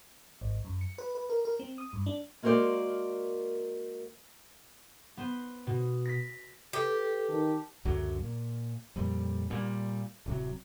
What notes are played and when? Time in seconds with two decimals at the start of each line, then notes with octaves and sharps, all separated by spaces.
0.41 G#1
0.65 F#2
0.81 C#7
0.98 B4
1.15 B4
1.30 A#4
1.45 A#4
1.59 C4
1.78 D#6
1.93 G2
2.06 D4
2.42 G#3 A#3 F#4 A#4 C5 D5
5.17 B3 C5
5.67 B2
6.05 A#6 B6
6.73 G4 A4 B4
7.29 D#3 A5
7.85 C#2 F#2 D3 F#3
8.22 A#2
8.96 F2 A#2 G3
9.50 A#2 G3
10.26 D1 C3 F#3